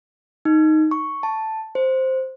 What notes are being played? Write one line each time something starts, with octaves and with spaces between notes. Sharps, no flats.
D#4
C#6
A5
C5